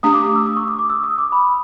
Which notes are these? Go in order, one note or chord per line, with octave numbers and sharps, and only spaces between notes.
A3 D4 G4 D#6
D6
D#6
E6
D#6
C#6
D6
D6
E6
D#6
D6
B5